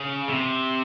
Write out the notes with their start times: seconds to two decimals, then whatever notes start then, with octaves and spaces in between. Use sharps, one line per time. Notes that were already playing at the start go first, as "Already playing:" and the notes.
Already playing: C#3
0.29 C3